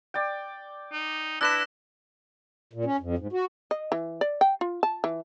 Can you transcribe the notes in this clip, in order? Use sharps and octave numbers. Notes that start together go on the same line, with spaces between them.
D5 G5
D#4
D4 E4 B4 E6 A#6 E7
A#2
C#4
F2
G#2
F#4
D#5
E3
D5
G5
F4
A5
E3